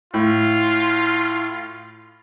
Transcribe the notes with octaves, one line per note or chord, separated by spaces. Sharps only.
A2 F4